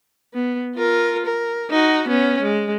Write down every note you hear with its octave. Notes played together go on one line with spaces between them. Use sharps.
B3
F4 A#4
A#4
D#4 F#4
B3 C#4
G#3